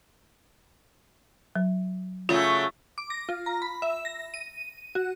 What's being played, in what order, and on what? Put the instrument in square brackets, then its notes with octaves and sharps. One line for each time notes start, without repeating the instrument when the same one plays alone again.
[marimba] F#3
[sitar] C#3 F#3 A3 [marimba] F4
[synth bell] D6
A#6
F4
A#5
B5
E5
A#6
D#7
F#4